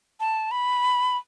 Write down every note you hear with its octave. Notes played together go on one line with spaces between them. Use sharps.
A5
B5